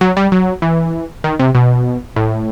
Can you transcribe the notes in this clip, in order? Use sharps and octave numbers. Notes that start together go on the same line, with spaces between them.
F#3
G3
F#3
E3
D#3
C3
B2
A2